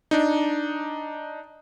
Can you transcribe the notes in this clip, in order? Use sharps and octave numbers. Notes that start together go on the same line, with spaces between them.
D4 D#4